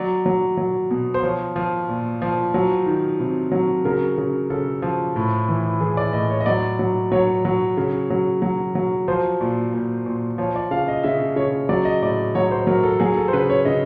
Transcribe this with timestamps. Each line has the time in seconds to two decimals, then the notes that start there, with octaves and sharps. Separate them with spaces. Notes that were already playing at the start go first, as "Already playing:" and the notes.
Already playing: F#3 D5
0.26 F#3
0.57 F#3
0.91 B2
1.14 C5
1.23 F3 C#5
1.56 F3
1.89 A#2
2.22 F3
2.54 F#3
2.86 D#3
3.20 C3
3.52 F#3
3.84 C#3 A#4
4.18 C#3
4.50 C#3 A4
4.82 F3
5.16 A2
5.49 E3
5.80 E3 G#4
5.97 D5
6.13 A2 D#5
6.30 C#5
6.41 D#5
6.46 F#3 D5
6.79 F#3
7.12 F#3 C#5
7.45 F#3
7.77 C#3
8.10 F#3
8.42 F#3
8.75 F#3
9.08 F3 C5
9.41 A#2
9.73 A#2
10.06 A#2
10.38 F3 C#5
10.56 D5
10.71 C#3 F5
10.88 D#5
11.03 C#3 E5
11.36 C#3 C#5
11.69 F#3 D5
11.85 D#5
12.02 A2 D5
12.35 F#3 C#5
12.51 C5
12.67 F#3 A#4
12.83 A4
13.00 F#3 G#4
13.17 A4
13.28 C5
13.33 C#3 B4
13.50 C#5
13.65 C#3 D#5